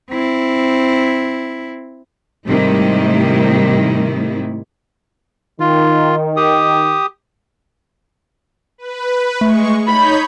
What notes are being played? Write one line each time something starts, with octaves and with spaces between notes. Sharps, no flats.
C4 E4
G#2 C3 D#3 G3 A3 E4
D#3 F4
G4 D#6
B4
G#3 A3 C#6
D#4 C#5 B5 G6